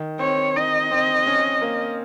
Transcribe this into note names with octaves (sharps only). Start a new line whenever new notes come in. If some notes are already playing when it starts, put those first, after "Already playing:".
Already playing: D#3
C4 C#5
D#4 D#5
C4
C#4
A#3